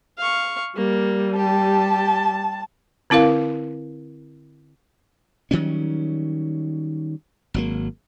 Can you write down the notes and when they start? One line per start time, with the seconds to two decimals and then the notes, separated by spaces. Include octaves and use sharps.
0.18 F5 C#6
0.76 G3 A#3
1.37 G4 A5
3.10 D3 C4 E4 A#4 F5
5.51 D#3 F#3 G3 C#4
7.54 G#1 F#3 A#3